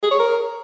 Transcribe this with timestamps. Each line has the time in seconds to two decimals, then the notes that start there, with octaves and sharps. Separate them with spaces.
0.03 G#4
0.11 C#5
0.19 A#4